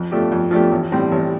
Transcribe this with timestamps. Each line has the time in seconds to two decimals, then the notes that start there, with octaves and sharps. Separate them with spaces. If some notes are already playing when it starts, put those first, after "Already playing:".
Already playing: F2
0.11 F3 A3 D4 G4
0.32 F2
0.51 F3 A3 D4 G4
0.72 A1
0.92 A2 G3 C4
1.12 A1